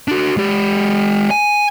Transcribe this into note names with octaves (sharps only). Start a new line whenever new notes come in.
D4 F#4
G#3 G4
G#5